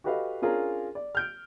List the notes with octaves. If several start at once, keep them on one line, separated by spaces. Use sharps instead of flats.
F#4 G4 A4 B4 D#5 F5
C#4 D4 F4 G#4 A#4
D5
F6 G6 D7